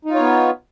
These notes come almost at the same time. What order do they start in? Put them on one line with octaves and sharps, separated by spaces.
D#4 F4 C#5 B3